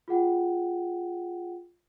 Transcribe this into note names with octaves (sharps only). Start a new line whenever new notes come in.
F4 G#4 F#5 G5